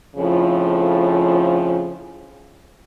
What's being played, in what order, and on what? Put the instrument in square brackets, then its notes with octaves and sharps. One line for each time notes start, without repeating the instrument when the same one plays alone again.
[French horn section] F2 A2 C#3 F3